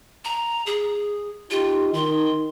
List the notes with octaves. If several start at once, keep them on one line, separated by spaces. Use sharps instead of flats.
A#5
G#4
D#4 F4 G4
D#3 C6